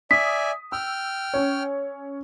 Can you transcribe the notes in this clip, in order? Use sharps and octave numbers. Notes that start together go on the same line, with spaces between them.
D5 E5 G#5 D#6 B6
G5 E6 F6
C#4 C#5